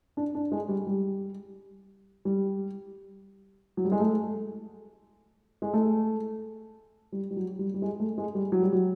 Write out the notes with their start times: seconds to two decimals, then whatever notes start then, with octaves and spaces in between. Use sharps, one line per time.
0.17 D4
0.35 D4
0.52 G#3
0.69 G3
0.87 G3
2.25 G3
3.77 F#3
3.85 G3
3.92 G#3
4.00 A3
5.62 G#3
5.73 A3
7.12 G3
7.31 G3
7.36 F#3
7.59 G3
7.74 G3
7.82 G#3
8.00 A3
8.18 G#3
8.35 G3
8.52 F#3
8.62 G3
8.73 F#3